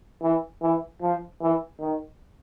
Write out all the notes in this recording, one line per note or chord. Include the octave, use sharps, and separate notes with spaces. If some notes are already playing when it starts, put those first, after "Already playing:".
E3
E3
F3
E3
D#3